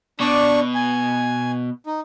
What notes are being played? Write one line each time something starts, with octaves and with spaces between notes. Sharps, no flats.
B2 D4 D5 C#6
G#5
D#4